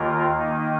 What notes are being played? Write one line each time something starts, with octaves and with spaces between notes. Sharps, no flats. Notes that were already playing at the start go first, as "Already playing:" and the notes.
Already playing: D#2 D#3 A#3 F4 A#4
D#3 A#3 D#4